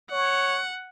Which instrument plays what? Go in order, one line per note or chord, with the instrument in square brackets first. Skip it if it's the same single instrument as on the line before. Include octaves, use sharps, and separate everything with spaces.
[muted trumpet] C#5 [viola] F#5